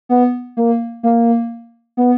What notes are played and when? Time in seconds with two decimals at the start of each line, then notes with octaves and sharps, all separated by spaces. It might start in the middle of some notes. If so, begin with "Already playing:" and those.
0.09 B3
0.57 A#3
1.03 A#3
1.97 B3